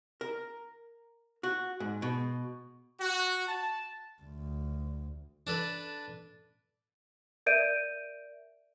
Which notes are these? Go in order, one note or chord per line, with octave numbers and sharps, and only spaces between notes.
A#4
F#4
G#2
B2
F#4
A5
D2
D4 A4 B4
A#4 D5 E5 G6 D7 D#7